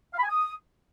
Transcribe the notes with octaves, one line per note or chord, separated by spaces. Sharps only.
F5
B5
G#5
D#6